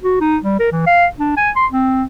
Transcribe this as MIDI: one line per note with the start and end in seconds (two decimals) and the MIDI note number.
0.03 0.16 66
0.21 0.37 63
0.43 0.57 55
0.60 0.68 70
0.72 0.82 52
0.87 1.06 77
1.18 1.32 62
1.37 1.50 80
1.56 1.66 84
1.72 2.03 60